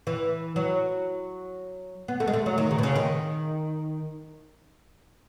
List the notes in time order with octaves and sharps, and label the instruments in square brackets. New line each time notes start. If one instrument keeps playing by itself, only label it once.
[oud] E3
F#3
B3
A3
G#3
A3
F#3
D#3
C#3
B2
C#3
D#3